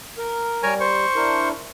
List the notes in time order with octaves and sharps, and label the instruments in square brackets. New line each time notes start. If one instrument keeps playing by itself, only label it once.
[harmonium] A#4
[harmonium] G3 [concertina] A#4 C#5 G#5
[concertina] C5 C#6
[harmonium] D4 E4 A#4